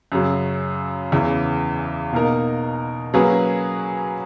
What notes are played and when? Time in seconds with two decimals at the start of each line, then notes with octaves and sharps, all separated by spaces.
0.12 F#2 C#3 F#3
1.12 E2 C#3 E3
2.13 B2 A#3 D#4 A#4
3.14 F#3 A#3 C#4 G#4 B4